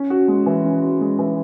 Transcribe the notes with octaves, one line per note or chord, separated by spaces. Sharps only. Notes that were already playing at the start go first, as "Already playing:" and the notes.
Already playing: C#4
F#4
G#3
E3
C#4
F#4
G#3
E3